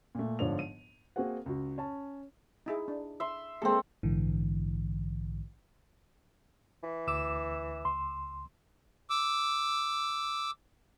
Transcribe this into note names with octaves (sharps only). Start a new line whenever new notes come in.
A#2 A3
G1 G#2 F3 D4 C#5 F7
D#7
A#3 C4 F#4 G#4 C5 F#5
C#2 F#4
C#4 A5
D#4 E4 G#4
D4
E5 C6
G#3 A#3 C4 G#4 A4
A#1 G#2 D3 E3
E3
D2 D6 E6 E7
C#2 C6
D6 E6